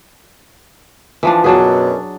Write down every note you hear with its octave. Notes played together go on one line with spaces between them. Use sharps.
E3 F3 D4
F#2 B2 F#3 D4 G#4